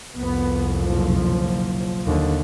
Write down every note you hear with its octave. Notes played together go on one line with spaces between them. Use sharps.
C2 F2 B3
F#1 B1 F3
D#2 D3